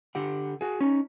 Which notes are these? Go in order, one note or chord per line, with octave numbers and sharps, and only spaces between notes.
D3 G4 F#5
F#4 G#4
C#4 D#4